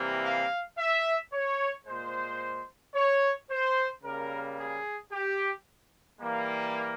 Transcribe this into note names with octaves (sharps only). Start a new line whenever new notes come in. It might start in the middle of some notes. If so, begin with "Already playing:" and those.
Already playing: C3 E3 G3 A#3
F5
E5
C#5
A#2 G#3 C5
C#5
C5
C#3 G3 A#3 A#4
G#4
G4
E3 G3 A#3